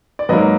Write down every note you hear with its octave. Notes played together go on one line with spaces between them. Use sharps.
D5
G#2 F#3 A#3 B4 D#5